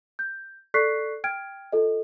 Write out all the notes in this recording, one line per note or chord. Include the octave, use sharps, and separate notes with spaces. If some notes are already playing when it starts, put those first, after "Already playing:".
G6
A4 D5 C#6 F#6 B6 C7
G5 F6 G#6 D7
F4 A4 D#5